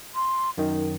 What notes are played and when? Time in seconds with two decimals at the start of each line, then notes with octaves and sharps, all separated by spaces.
0.15 C6
0.58 F#2 D#3 D#4